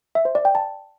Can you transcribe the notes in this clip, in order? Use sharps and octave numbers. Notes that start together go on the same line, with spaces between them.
E5
C5
D5
G5
A5